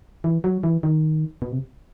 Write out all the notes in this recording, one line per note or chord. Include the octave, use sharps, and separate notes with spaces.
E3
F#3
E3
D#3
B2
C3